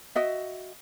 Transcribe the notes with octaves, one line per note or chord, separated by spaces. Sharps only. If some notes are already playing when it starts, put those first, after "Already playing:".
F#4 D#5 E5